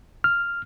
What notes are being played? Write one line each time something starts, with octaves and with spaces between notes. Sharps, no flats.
F6